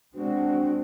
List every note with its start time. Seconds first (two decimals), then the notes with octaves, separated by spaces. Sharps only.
0.15 G#3 C4 D4 F#4